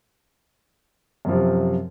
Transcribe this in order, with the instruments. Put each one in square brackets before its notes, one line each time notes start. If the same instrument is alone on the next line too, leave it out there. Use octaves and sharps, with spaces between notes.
[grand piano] F#2
F3
C3